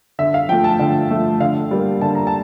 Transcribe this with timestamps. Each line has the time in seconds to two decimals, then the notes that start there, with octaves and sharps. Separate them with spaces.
0.19 D3 E5
0.34 F5
0.49 F3 A3 G5
0.64 A5
0.79 D3 G5
1.11 F3 A3
1.40 D3 F5
1.71 G3 A#3
2.01 D3 A5
2.15 A#5
2.27 A5